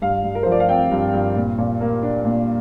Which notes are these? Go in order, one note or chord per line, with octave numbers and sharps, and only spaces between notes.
G2 F5
G2
A#4
F3 C5
D5
F5
C4 G5
G2
G2
A#2
A#2
A#3
D4
A#2